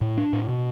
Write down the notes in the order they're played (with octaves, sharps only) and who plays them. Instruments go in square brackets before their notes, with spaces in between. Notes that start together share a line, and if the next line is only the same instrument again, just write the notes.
[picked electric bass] A2
D4
A2
B2